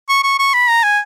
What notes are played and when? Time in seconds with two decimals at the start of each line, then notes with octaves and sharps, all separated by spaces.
0.09 C#6
0.23 C#6
0.39 C#6
0.54 B5
0.69 A#5
0.83 G#5